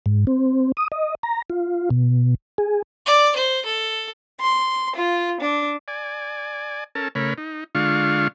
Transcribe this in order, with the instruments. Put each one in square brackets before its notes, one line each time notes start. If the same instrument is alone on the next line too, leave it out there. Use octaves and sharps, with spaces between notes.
[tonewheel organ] G#2
C4
D#6
D#5
A#5
F4
B2
G#4
[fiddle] D5
C5
A4
[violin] C6
F4
D4
[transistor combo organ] D5 G#5
C#4 A4 A#4 A5
C#3 A3 A#4 C#5 B5
D#4
D3 G#3 D4 F4 F5 C#6